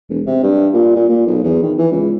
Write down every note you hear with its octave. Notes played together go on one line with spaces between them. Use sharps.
E1
C3
G2
A#2
A#2
A#2
B1
E2
D#3
E3
C#2